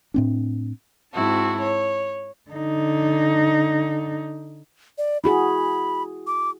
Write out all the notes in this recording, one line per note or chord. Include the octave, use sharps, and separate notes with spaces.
A2 C4 D4
G#2 C4 E4 F#4 A5
C#5
D3 D#4
D5
E4 F#4 G#4 B5
D6